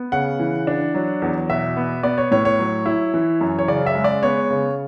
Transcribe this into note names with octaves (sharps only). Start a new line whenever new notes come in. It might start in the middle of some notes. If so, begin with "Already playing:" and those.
Already playing: B3
C#3 F#5
E3
D4
F#3
E2
B2 E5
B3
B3 D5
C#5
A2 C#5
C#5
F#3
E4
E3
F#2
C#5
C#3 D5
E5
G#3
D5
B3 C#5
C#3